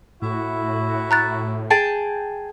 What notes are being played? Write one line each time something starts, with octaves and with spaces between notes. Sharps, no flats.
A2 E4 F#4
A#5 F#6 A6
G#4 G5 A5